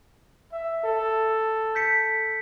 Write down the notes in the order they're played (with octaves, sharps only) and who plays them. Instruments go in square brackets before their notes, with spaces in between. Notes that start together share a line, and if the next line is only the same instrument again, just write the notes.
[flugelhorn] E5
A4
[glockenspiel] G6 B6 C#7